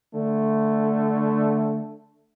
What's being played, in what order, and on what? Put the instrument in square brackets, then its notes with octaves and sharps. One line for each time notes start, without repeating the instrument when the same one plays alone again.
[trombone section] D3 A3